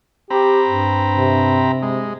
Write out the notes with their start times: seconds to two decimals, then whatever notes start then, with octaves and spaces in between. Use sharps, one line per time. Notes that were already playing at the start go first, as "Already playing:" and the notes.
0.30 C4 G4 A#5 B5
0.66 G2
1.16 C3
1.82 G#3